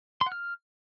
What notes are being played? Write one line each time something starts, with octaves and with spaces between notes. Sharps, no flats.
C6
F#5
F6